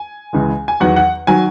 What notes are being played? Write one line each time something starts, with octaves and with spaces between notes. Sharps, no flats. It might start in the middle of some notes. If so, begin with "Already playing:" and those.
Already playing: G#5
C#2 C#3 E3 G#3
G#5
E2 D#3 F#3 F#5
F#5
D#3 F#3 G#5